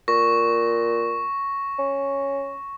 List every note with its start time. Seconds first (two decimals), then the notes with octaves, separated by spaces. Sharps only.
0.08 A#2 C#6 A#6
1.79 C#4